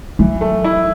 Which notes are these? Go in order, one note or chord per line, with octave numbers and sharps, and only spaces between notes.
E3 F#3
A3
E4